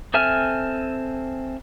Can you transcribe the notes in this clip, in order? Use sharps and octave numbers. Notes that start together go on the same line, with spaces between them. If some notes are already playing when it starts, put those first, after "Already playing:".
C4 A4 E5 G#5 F6